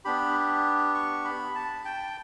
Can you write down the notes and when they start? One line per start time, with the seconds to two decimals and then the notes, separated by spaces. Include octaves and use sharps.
0.05 B3 D4 G4 B5
0.94 C#6
1.25 B5
1.55 A5
1.85 G5